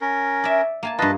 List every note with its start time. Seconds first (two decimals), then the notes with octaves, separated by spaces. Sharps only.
0.01 C#4 A#4
0.44 D5 E5
0.83 A#3 G#5 A5
0.99 G2 F4 B4 D#5 A5